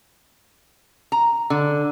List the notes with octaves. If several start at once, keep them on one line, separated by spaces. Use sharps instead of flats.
A#5
D3